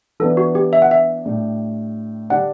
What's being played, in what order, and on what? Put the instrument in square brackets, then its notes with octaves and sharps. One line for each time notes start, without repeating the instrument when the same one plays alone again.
[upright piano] E3 B3 D4 [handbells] A4
[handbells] F#4
G4
E5
F#5
E5
[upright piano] A2 G3 D4 G4
[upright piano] D3 G3 D4 [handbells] F#5